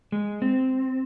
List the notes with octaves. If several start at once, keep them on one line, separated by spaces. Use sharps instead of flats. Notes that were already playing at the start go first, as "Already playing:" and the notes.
G#3
C4